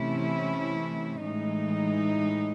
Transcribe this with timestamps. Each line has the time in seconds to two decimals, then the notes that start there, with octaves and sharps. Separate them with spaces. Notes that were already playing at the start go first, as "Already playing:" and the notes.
Already playing: C3 E3 A3 C#4 E4
1.24 A2 E3 G#3 D#4